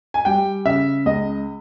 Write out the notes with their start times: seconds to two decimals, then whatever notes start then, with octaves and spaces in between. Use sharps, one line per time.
0.14 G#5
0.25 G3 G5
0.65 C#3 E5
1.06 C#2 D#5